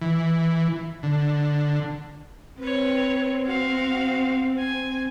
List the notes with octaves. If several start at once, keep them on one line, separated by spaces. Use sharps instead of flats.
E3
D3
C4 B4 C#5
F#4 F5
G#5